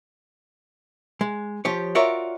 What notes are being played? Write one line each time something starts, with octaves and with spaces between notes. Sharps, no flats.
G#3
F3 G4 C#5
F4 F#4 A#4 C#5 D5 E5